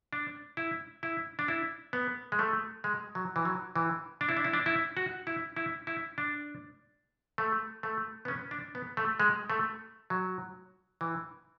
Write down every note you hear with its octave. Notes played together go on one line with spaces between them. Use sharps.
D4
E4
E4
D4
E4
B3
G#3
A3
G#3
F#3
E3
F#3
E3
D4
E4
D4
E4
D4
E4
F#4
E4
E4
E4
D4
A3
A3
B3
C#4
D4
B3
A3
G#3
A3
F#3
E3